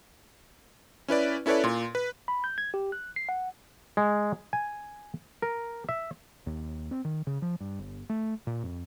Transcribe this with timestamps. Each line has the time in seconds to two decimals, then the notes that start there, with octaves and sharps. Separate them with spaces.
1.08 C#4 E4 B4 D5
1.46 C#4 E4 A4 B4 C#5 D5
1.64 A#2 C6
1.95 B4
2.28 B5
2.44 G6
2.58 G#6
2.74 G4
2.92 F#6
3.16 C7
3.29 F#5
3.97 G#3
4.53 G#5
5.42 A#4
5.89 E5
6.46 D#2
6.91 C4
7.05 D#3
7.27 C#3
7.42 F3
7.61 G2
7.79 G1
8.09 A3
8.47 A#2
8.63 F2